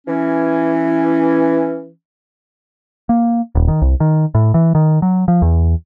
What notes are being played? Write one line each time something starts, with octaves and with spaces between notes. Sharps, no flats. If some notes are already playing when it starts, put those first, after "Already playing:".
E3 C#4
A#3
D#1
D#3
C2
D#3
A2
E3
D#3
F#3
F3
E2